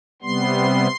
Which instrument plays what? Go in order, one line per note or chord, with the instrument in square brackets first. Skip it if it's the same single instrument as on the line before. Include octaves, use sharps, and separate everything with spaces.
[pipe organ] C3 G3 B3 C6